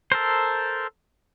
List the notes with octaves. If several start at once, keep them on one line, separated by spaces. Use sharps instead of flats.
A4 A#4 C5